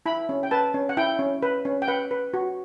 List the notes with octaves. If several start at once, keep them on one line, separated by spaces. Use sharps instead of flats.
E4 B5
C#4
G5
B4 A5
C#4
F#5
E4 G5
C#4
B4
C#4
G5
B4 F#5
B4
F#4